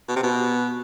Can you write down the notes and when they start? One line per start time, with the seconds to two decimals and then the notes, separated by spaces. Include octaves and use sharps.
0.08 B2
0.16 C3
0.23 B2